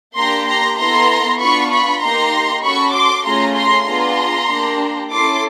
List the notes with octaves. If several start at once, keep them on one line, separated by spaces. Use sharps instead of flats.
A#3 D4 G4 A#5 C6
A#5 C6
B3 E4 A4 A#5 C6
B3 D4 F4 B5 C#6
B5 C#6
A#3 D#4 G4 A#5 C6
C#4 F#4 A4 B5 C#6
C6 D6
A3 C#4 F4 G#4 A#5 C6
A#5 C6
B3 D4 F4 G#4 A#5 C6
A#3 D4 G4
C#4 E4 A4 C6 D6